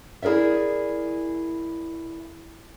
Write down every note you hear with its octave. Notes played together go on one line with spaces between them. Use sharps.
E4 G#4 A#4 D5 E5